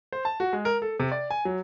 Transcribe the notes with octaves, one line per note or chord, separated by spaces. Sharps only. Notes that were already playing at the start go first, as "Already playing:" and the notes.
C5
A5
F#4
G#3
A#4
A4
C3
D5
G#5
F#3